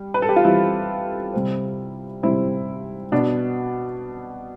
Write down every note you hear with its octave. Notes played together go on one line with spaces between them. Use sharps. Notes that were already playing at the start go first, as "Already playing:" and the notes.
Already playing: G3
B4
A4
G4
F4
E3 G3 C4 E4
C3 G3 C4
C3 G3 C4 E4
B2 B3 D4